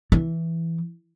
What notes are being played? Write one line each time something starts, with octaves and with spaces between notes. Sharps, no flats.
E3